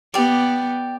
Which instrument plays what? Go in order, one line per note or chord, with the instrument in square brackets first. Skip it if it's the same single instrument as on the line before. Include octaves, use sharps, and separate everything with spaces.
[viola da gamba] B3 [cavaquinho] G4 D5